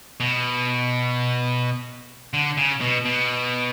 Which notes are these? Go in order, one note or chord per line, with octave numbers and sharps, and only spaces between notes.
B2
D3
C#3
B2
B2